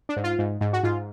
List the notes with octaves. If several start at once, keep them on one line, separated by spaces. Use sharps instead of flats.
D4
G#2
F4
G#2
G#2
F#4
G#2 F4